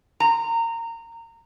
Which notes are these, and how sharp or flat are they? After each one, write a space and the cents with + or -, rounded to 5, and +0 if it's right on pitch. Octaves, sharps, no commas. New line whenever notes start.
A#5 -20